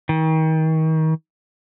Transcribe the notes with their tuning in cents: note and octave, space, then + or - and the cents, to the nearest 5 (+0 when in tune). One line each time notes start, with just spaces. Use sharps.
D#3 +35